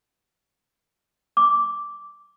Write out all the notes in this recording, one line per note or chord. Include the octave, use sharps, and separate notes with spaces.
D6